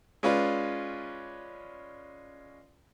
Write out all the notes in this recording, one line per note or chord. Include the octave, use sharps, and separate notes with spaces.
G#3 C#4 F4 B4 D5